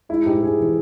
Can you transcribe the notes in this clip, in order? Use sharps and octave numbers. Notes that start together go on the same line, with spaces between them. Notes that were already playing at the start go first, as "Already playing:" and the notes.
G#3 E4
G#2 G4
G#2 G#4
E3